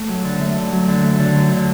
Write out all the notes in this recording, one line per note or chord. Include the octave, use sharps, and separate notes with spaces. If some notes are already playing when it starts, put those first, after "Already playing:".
Already playing: A3
F#3
D3
A3
D3
F#3
D3
A3
D3
F#3
D3